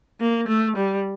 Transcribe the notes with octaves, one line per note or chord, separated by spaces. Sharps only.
A#3
A3
G3